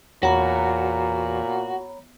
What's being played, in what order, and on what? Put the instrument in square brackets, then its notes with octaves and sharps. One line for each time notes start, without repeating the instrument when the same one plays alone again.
[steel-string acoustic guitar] E2 [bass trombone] A#2 [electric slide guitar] F#4 [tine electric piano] C#5 A#5 B5